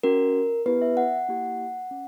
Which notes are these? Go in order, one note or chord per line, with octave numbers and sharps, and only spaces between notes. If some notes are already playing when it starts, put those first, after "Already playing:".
C#4 F#4 A#4
B3 E4 G4 B4
E5
F#5
A#3 E4 G4
C#4